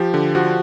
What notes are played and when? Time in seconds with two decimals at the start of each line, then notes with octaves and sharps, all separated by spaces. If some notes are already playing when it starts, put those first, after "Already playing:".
Already playing: F3 G4
0.14 D3
0.35 F3 F#4